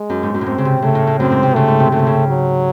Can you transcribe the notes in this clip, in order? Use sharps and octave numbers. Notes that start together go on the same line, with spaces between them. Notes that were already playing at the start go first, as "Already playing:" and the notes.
Already playing: G#3
F#2
G#2
F#2
A2
G#2 C4
C#3
C3
C#3 A3
A2
A2
F#2 C4
G#2
C3
C#3 A3
G#2
C3
C#3 A3
C3
C#3
F#3